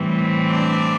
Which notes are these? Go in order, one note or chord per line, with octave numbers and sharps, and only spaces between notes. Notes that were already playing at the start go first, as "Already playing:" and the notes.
Already playing: A2 E3 G3 C4
D4 D5